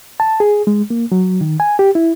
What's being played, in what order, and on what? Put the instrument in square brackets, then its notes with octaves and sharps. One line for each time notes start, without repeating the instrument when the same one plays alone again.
[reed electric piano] A5
G#4
G#3
A#3
F#3
D#3
G#5
G4
E4